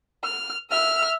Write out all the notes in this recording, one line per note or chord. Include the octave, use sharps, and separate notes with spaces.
F6
E5 F6